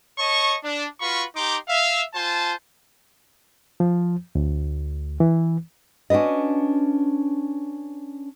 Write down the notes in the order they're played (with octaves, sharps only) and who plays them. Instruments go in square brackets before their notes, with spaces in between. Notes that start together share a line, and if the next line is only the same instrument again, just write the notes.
[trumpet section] C#5 D#5 A5 C#6
D4
F4 F#4 B4 F5 B5 C#6
D#4 G4 A#5 C6 D6
E5 F5
F4 C5 G#5 A5
[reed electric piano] F3
D2
E3
[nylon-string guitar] C#4 D4 F#4 B4 D#5